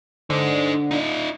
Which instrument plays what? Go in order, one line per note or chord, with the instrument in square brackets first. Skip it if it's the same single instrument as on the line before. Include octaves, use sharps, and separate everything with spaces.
[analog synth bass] D3 [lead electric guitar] D#4 C5
[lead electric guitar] D#4 F4